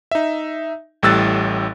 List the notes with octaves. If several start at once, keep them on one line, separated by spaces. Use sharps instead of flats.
D#4 E5
A1 A2 G3 E6 F#6 A6